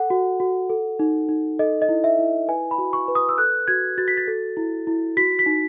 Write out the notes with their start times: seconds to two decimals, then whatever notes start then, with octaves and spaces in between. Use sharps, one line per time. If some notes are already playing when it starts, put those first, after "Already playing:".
Already playing: A4 F#5
0.10 F#4
0.40 F#4
0.70 A4
0.99 D#4
1.29 D#4
1.59 A4 D#5
1.82 D#5
1.89 E4
2.04 E5
2.19 E4
2.48 B4 G#5
2.71 B5
2.78 F#4
2.93 C#6
3.08 B4
3.15 D#6
3.29 E6
3.38 A4 F#6
3.67 F#4 G#6
3.98 F#4 A6
4.08 B6
4.17 A6
4.28 A4
4.57 E4
4.87 E4
5.17 F#4 B6
5.39 B6
5.46 D#4